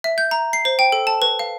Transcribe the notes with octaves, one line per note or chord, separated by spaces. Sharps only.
E5
G6
A#5
C7
C5
G5
A4
A5
B4
F5